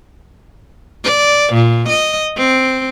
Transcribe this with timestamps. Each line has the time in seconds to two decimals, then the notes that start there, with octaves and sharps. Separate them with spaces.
1.04 D5
1.53 A#2
1.89 D#5
2.36 C4